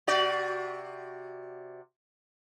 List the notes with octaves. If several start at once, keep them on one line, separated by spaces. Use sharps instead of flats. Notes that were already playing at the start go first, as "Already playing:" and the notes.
C3 F#4 D5